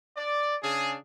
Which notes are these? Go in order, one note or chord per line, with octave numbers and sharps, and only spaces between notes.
D5
C#3 D4 G#4